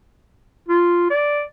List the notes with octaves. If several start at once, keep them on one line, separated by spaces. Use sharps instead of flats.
F4
D5